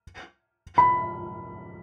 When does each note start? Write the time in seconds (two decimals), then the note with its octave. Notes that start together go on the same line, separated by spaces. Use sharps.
0.78 B5